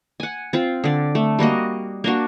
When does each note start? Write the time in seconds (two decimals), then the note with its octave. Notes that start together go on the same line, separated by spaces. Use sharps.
0.20 F#5 G#5
0.53 C4 F4
0.84 D3 D5
1.15 A3
1.39 G3 A#3 F#4 D#5
2.04 A#3 D4 F#4